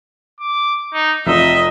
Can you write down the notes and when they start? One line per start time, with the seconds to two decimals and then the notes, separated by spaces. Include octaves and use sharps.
0.40 D6
0.94 D#4
1.27 F1 F4 D#5 E5